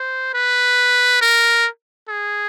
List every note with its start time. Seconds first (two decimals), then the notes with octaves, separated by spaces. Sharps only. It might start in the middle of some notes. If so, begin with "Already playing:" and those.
Already playing: C5
0.34 B4
1.21 A#4
2.09 G#4